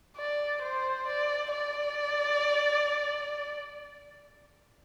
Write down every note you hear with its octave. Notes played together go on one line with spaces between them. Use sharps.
D5
C5
D5
D5